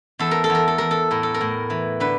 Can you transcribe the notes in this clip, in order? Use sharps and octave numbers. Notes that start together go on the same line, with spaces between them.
E2 A4
A#4
A4
E2
A#4
A4
E2 A#4
A4
A2 A#4
A4
A#4
A2
E3
D3 B4